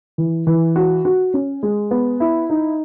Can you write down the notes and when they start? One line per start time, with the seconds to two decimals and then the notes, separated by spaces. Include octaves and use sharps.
0.18 E3
0.47 E3
0.76 F#4
1.05 F#4
1.34 C#4
1.63 G#3
1.91 B3
2.20 E4
2.50 D#4